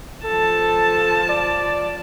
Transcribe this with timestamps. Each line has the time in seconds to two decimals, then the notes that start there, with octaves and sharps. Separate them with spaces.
0.25 F3 A4 A5
1.29 D5